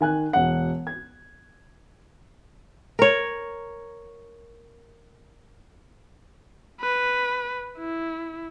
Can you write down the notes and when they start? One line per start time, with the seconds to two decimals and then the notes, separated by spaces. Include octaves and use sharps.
0.01 D#3 G#5 F#6
0.33 E1 F#5
0.87 G#6
2.99 A#4 C#5
6.81 B4
7.78 E4